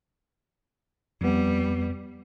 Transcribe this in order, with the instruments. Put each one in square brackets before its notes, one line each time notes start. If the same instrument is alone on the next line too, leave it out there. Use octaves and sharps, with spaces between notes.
[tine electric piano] F2 B3 [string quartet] G3